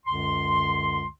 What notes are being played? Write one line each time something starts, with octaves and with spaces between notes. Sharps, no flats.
C#2 F#2 D3 C6